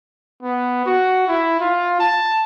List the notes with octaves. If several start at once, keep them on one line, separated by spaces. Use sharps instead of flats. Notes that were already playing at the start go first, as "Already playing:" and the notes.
B3
F#4
E4
F4
A5